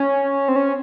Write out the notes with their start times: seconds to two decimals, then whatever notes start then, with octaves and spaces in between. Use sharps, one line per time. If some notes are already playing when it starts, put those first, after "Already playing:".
Already playing: C#4
0.48 C4
0.56 C#4